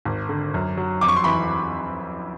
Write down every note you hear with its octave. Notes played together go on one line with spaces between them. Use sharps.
G#1
D3
F#2
F#3
F2 D6
C#6
C6
E3 B5 C#6